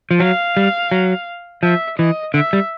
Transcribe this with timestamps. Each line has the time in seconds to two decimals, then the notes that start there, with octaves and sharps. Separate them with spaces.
0.11 F3
0.20 F#3 F5
0.57 G3
0.91 F#3
1.63 F3 E5
1.99 E3 D#5
2.34 D3 E5
2.53 G3